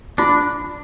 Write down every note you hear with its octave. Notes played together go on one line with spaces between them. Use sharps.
D4 F4